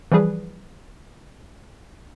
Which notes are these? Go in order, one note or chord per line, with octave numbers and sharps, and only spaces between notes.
E3 F3 G3 G#4 B4